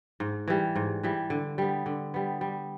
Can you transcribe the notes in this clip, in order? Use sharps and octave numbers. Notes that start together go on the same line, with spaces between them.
G#2
E3 G3
G#2
E3 G3
D3
G3 B3
D3
G3 B3
G3